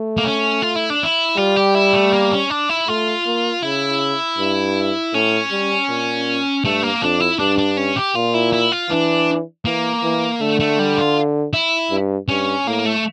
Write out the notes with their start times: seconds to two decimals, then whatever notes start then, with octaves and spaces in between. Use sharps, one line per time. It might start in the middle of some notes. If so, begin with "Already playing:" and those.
Already playing: A3
0.17 A#3
0.24 C#4
0.62 F4
0.76 E4
0.90 D4
1.03 E4
1.37 G3 F4
1.56 G4
1.75 E4
1.93 A3
2.12 A#3
2.31 C#4
2.50 D4
2.69 E4
2.88 A3 F4
3.26 A#3
3.62 C#3 E4
4.39 G2
5.14 A2 C#4
5.51 G3
5.89 A#2
6.64 G2 A3
6.83 A#3
7.02 F2 D4
7.20 E4
7.39 G2 D4
7.58 D4
7.77 C#4
7.96 G4
8.15 A#2 F4
8.34 E4
8.53 E4
8.72 F4
8.90 E3 D4
9.65 E3 A#3
10.03 E3
10.41 D3 A3
10.60 A3
10.79 G3
10.98 F4
11.53 E4
11.91 G2
12.28 G2 C#4
12.66 A2 A#3
12.86 A3